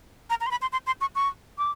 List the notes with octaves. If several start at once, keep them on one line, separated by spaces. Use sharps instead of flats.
A#5
A#5
C6
B5
C6
C6
C6
C#6
C#6
D6